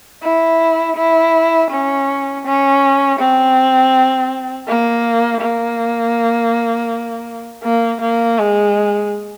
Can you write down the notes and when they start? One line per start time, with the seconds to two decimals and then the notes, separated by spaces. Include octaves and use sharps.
0.23 E4
0.97 E4
1.71 C#4
2.45 C#4
3.19 C4
4.67 A#3
5.41 A#3
7.63 A#3
8.01 A#3
8.38 G#3